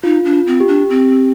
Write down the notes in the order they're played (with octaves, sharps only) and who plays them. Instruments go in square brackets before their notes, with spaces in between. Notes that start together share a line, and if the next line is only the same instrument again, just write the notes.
[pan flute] D#4 [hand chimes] F4
[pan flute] D4
[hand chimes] F4
[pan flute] C4
[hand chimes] G4
[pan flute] D4
C4